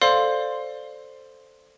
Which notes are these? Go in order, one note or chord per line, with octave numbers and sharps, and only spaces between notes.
A4 C5 D5 F5 C6